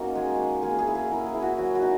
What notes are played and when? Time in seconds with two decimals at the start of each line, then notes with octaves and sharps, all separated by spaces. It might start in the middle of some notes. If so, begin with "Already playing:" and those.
Already playing: A#3 C#4 D#4 F#4
0.15 G#3 G#4
0.39 D#4
0.63 A#3 G#4
0.79 G#4
0.87 E4
0.95 G#4
1.11 E4 A#4
1.26 G#4
1.34 E4
1.42 F#4
1.58 F#3 F#4
1.75 F#4
1.82 D#4